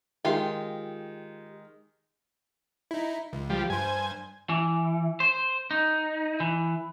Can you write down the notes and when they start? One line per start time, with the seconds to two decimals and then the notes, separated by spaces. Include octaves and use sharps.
0.25 D#3 G#3 F4 G4 F5
2.91 D#4 E4
3.33 C#2
3.50 F3 G3
3.70 G2 C5 G#5
4.49 E3
5.20 C5
5.71 D#4
6.40 E3